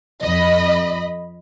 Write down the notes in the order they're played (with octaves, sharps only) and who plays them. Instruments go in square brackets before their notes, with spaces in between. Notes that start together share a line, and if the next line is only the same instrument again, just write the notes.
[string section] F2 D#5 B5